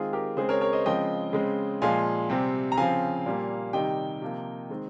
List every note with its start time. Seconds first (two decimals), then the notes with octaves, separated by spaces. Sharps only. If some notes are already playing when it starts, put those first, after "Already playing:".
Already playing: D#3 G#3 C4 F4 G#4
0.13 G4 A#4
0.37 C#3 G#3 C4 G#4 C5
0.49 A#4 C#5
0.61 A#4 C#5
0.73 C5 D#5
0.85 C#3 F3 G#3 C4 D#5 G5
1.33 C#3 G#3 C4
1.82 A#2 F3 G#3 F5 G#5
2.30 C3 G3 C4
2.72 A#5
2.77 C#3 F3 C4 F5 G#5
3.26 A#2 G3 A#3
3.73 C3 D#3 G3 D#5 G5
4.22 C3 F3 A#3
4.70 D#3 G#3 C4